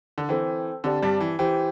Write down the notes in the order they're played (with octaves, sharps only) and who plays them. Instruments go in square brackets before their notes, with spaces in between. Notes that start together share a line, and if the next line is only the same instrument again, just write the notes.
[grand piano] D3
[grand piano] E3 [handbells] C4 A4 C5 G5
[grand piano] D3 [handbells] C4 G4 D5 A5
[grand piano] G2 G3
E3
[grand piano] E3 [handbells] G4 C5 G5